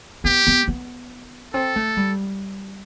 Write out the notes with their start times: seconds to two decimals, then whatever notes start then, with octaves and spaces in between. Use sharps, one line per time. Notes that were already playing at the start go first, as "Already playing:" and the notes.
0.24 B3 G4
0.47 B3
0.68 B3
1.53 C4 A4
1.76 A3
1.97 G3